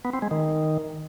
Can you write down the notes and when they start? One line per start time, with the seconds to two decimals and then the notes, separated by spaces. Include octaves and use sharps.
0.05 B3
0.13 C4
0.22 G#3
0.31 D#3